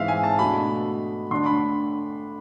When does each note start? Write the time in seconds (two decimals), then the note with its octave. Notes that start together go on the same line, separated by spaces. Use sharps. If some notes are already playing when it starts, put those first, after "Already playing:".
Already playing: G#2 E3 G#3 C4 E5 F5
0.08 G#5
0.24 A5
0.39 B2 A3 D4 B5
1.31 D3 A3 D4 C6
1.46 B5